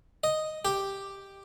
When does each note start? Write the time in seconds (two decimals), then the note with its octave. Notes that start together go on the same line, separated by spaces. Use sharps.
0.24 D#5
0.65 G4